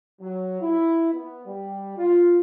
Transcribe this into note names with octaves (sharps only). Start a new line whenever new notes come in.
F#3
E4
B3
G3
F4